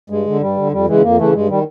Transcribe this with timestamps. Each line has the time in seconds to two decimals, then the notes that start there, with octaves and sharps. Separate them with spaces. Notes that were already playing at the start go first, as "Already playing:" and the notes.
0.10 G2 G#3
0.26 D3
0.41 G2 G3
0.57 D3
0.72 F2 G3
0.86 C#3 E3 G#3
1.02 F2 A#3
1.17 C#3 E3 A3
1.33 G2 G#3
1.48 D#3 G3